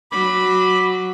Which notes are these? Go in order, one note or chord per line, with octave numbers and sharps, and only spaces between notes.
F#3 B5 D6